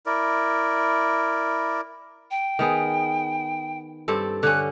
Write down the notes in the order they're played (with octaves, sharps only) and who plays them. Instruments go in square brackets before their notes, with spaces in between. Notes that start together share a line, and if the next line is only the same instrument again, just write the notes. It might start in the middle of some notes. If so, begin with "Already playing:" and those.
[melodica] E4 A#4 D5
[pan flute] G5
[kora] D#3 B3 G#4
G2 C4 A4
[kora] D3 C#4 [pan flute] F#6